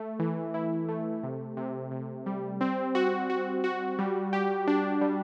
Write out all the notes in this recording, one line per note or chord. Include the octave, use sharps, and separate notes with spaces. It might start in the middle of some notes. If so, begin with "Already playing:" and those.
Already playing: A3
E3
E4
A3
C3
C3
C3
G3
C4
F#4
F#4
F#4
G3
G4
D4
G3